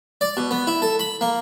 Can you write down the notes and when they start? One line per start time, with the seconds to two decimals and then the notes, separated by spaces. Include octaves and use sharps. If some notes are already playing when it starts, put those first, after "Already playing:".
0.21 D5
0.37 B2
0.51 B3
0.67 E4
0.82 A4
0.99 B5
1.21 A#3